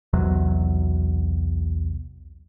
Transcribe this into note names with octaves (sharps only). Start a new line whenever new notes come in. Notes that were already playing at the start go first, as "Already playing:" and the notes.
B1 E2 C3 F#3